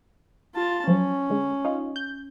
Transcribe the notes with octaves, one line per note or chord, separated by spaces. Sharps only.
F4 A5
F3 F#3 C#4
D3 G#3
D#4 F4
G6